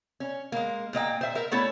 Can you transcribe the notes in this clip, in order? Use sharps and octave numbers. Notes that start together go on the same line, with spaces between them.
C#4
G#3 A#3
A#2 A#3 D#5 G5
C5 E5
A#4 E5
A3 B3 C#4 E4 A4 C#5